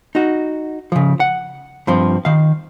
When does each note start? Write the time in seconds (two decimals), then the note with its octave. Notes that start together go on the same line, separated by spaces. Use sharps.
0.15 D#4 F#4
0.92 C#3 F3
1.20 F#5
1.87 G2 F3 C4
2.25 D#3 F5